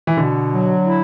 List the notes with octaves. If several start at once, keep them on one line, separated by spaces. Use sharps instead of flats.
E3
B2 D3
F#3
E4